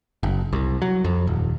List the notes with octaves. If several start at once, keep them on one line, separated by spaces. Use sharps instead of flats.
F#1
C2
F#3
F2
D#1